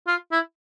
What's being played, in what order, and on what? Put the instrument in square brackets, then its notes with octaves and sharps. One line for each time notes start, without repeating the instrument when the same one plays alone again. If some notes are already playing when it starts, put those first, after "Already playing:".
[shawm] F4
E4